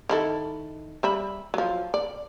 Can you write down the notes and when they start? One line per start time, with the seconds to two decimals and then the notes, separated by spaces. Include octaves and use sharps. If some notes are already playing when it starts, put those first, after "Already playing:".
0.09 D#3 E4 A4
1.03 G3 E5 B5
1.54 F3 F#3
1.94 D5